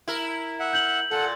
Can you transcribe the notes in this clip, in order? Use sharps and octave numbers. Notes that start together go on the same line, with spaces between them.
E4 A#4
E5 F#5
G6 F#7
A#2 A4 F#5